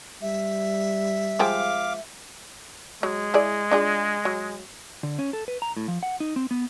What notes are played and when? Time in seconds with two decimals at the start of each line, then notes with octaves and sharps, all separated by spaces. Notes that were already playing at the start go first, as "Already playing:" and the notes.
0.22 G3 E5
1.39 F3 G#3 F5 G5 D6
3.03 F#3 G#3
3.34 E4 G#4 D5
3.71 D4 F4 G#4
4.25 F#3
5.03 D3
5.19 C#4
5.33 A4
5.48 B4
5.62 A#5
5.77 A2
5.88 F3
6.03 F#5
6.20 D#4
6.36 C4
6.51 B3